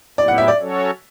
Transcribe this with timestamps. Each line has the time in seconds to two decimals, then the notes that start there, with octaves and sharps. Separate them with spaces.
0.18 A2 F#3 B3 E4 G4 D5
0.28 F#5
0.38 E5
0.48 D5
0.58 F#3 C#4 F#4 A4 C#5